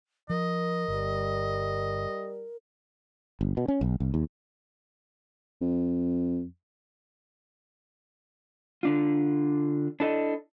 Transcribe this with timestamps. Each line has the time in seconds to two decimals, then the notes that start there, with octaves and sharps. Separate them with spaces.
0.30 F3 A#4 D#5
0.88 G1 G3
3.41 G1
3.57 B2
3.68 C#4
3.81 B1
4.00 C2
4.14 D#2
5.61 F2
8.83 D3 D4 F4
10.00 D4 E4 A4 D#5